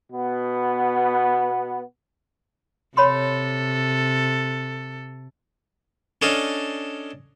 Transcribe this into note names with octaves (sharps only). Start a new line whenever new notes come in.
B2 B3
C3 A4 C#5 B5 C6
C#4 D4 A4 D#5 F5